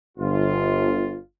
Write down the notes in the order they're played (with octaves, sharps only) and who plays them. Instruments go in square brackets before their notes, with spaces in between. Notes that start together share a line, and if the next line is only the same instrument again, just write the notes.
[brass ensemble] G1 F4